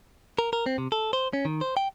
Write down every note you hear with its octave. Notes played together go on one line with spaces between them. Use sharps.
A#4
A#4
C4
C3
A4
C5
C#4
D#3
C5
G5